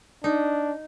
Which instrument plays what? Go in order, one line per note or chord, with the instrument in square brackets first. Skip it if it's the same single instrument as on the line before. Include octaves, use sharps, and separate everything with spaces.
[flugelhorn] D4 [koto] D#4